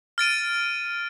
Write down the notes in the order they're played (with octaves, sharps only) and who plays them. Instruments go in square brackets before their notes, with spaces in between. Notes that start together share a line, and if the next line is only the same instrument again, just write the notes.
[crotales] F6 A6 D7 D#7